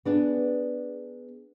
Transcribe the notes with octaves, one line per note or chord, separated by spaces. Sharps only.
B3 D4 G#4